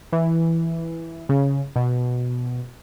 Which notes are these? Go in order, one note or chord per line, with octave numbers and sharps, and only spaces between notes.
E3
C#3
B2